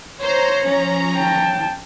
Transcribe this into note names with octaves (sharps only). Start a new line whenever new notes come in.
C5 C#5 A#5
F3 C#4 A#5
G5 A5